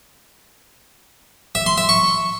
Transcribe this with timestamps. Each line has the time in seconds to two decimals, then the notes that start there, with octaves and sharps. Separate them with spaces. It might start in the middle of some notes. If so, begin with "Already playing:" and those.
1.55 E5
1.66 C6
1.78 E5
1.89 C#6